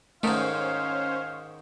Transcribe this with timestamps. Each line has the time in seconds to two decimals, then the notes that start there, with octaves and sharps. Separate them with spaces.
0.23 G#2 D#3 A3 C#4 A#4 C5 C#5 F5